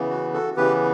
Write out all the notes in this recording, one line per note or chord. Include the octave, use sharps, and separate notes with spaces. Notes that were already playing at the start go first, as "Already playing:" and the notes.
Already playing: C#3 E3 B3
F#4
F#4 A4
C#3 E3 B3 G4 B4